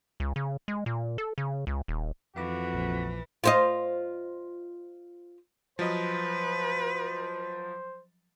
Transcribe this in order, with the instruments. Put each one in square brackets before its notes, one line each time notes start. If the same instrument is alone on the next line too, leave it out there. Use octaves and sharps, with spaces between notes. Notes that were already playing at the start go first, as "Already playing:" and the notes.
[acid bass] C#2
C#3
G#3
A#2
A4
C#3
C#2
D#1
[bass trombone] F2 [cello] E3 [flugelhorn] F#4 [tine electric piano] F5 D6
[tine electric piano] A#1 A#2 F3
[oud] F4 C5 D#5
[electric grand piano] F3 F#3 D#5 [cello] B4 [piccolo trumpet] C5